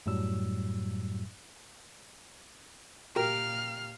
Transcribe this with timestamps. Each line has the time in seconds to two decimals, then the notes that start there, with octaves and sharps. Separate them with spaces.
0.06 F#2 A2 F#3 G3 E6
3.16 A#2 G4 A#4 F5 F6